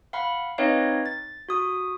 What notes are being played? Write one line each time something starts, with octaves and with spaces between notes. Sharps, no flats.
F5 F#5 B5
C4 D#4 B4 C#5 D#5 F5
A6
F#4 D#6